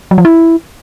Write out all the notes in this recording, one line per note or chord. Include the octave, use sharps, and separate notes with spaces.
F#3
F3
E4